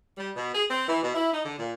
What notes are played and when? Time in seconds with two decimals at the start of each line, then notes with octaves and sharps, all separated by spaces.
0.18 G3
0.36 B2
0.54 G#4
0.69 C4
0.88 E3
1.03 B2
1.14 E4
1.33 D#4
1.45 D3
1.58 A#2